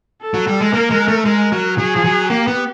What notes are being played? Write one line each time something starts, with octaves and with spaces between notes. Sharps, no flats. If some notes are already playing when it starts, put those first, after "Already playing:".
A4
F#3
G3
G#3
A#3 A#4
G#3
A3
G#3 A#4
F#3
F#3 G#4
F3
F#3
A#3 G4
B3